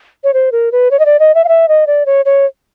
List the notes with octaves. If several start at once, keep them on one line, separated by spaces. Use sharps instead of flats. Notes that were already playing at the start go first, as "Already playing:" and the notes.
C#5
C5
A#4
B4
C#5
D#5
D5
D#5
E5
F5
E5
D#5
D5
C#5
C#5